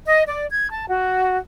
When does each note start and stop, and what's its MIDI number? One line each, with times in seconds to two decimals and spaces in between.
0.06 0.24 75
0.26 0.46 74
0.51 0.70 92
0.71 0.85 81
0.89 1.39 66